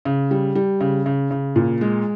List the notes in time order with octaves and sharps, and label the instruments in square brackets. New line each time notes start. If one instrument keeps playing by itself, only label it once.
[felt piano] C#3
G3
G3
C#3
C#3
C#3
A#2
G#3